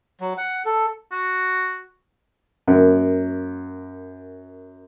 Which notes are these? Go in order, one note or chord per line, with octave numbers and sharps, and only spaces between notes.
F#3
F#5
A4
F#4
F#2 A#3